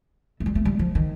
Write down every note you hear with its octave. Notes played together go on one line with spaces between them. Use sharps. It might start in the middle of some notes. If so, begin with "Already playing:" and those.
A3
G3
A3
G3
F3
D#3